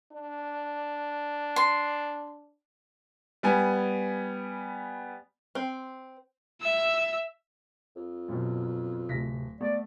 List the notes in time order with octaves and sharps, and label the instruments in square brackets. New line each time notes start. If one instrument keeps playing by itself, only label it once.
[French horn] D4
[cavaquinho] C6
[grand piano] G3 B3 G#5
[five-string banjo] C4
[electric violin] E5 E6
[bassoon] F2
[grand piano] F#2 B2
[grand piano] D1 A#6 B6 [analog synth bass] C3
[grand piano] A3 [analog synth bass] B3 [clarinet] D5